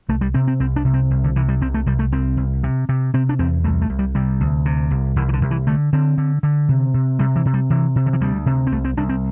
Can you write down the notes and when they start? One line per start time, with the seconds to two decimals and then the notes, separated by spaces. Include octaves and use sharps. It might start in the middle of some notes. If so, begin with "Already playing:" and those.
0.09 C2 A3
0.21 G3
0.34 C3 C4
0.47 C4
0.60 C2 C4
0.76 D4
0.85 C3
0.94 C4
1.10 C2
1.24 D3
1.36 C3 E3
1.49 G3
1.61 C2 C4
1.74 A3
1.86 C2 G3
1.99 A3
2.12 C2 C4
2.37 C2
2.64 C3
2.89 C3
3.14 C3 C4
3.29 D4
3.39 E2 C4
3.64 C2 A3
3.82 A3
3.90 C2
3.99 G3
4.15 C3 G3
4.41 D2
4.65 C3
4.91 C2
5.16 C2 E3
5.29 E3
5.33 D3
5.41 C2
5.51 E3
5.67 D3 A3
5.93 D3 C4
6.18 D3
6.43 D3
6.69 C3
6.94 C3
7.19 C3 G3
7.36 E3
7.45 C3
7.54 G3
7.70 C3 E3
7.96 C3
8.06 D3
8.13 E3
8.21 D2 G3
8.46 C3
8.67 C4
8.72 C2 A3
8.85 C4
8.97 C2 D4
9.09 C4